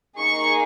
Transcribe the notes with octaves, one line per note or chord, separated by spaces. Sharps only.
A#3 D#4 G#4 C#6